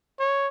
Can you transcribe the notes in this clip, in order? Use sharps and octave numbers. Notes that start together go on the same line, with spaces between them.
C#5